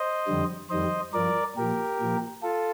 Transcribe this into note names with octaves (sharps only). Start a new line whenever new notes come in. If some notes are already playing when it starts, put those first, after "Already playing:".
Already playing: C5 D#5
F2 D3 G3
F2 D#3 G3 C5 D#5
G2 F3 A#4 D5
A#2 F3 G4 A#4
A#2 F3
F4 A4